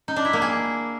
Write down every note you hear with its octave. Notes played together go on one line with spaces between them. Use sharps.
D#4
D4
E4
A#3
G#4